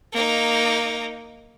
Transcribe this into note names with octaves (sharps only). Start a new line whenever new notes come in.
A#3 D#4